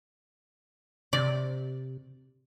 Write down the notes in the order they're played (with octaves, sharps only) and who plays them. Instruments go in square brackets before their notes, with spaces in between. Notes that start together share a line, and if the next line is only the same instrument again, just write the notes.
[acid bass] C3 [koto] D5